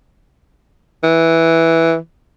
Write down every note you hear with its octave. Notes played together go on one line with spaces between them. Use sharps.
E3